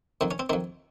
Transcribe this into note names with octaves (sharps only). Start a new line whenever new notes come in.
F2 D#3 C4
C#4
C4
F2 D#3 C4